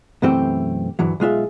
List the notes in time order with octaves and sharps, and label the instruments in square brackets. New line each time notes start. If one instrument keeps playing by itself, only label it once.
[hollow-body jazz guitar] B1 F#2 E3 A3 C4 G4
D2 G2 E3 F#3
B1 G#3 F4 E5